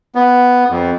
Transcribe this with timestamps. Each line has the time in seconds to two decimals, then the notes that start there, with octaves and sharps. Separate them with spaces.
0.15 B3
0.70 F2